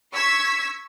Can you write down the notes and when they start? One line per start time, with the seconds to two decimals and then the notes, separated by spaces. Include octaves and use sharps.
0.13 C#6 E6 G#6 B6